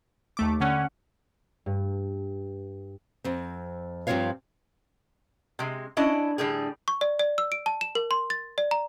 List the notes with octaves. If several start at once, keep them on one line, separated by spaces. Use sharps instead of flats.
D#2 A3 D6
D3 C#4 F#5
G2
F2 C4
G2 F3 C4 F4 C#5 F5
C3 G#3
C#4 D4 E4 D#5
A2 D3 G3 G#4
C#6
D5
D5
E6
D7
A5
E7
A#4
C6
A6
D5
A#5